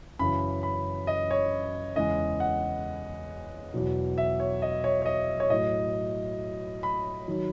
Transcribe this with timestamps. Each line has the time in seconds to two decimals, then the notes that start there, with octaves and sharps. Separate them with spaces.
0.19 F#2 C#3 E3 B5
0.63 B5
1.07 D#5
1.31 C#5
1.96 E2 C#3 E3 G#3 D#5
2.40 F#5
3.74 E2 B2 F#3
4.18 E5
4.40 C#5
4.62 D#5
4.84 C#5
5.02 C#5
5.06 D#5
5.40 C#5
5.50 A2 F#3 D#5
6.83 B5
7.28 D#3 F#3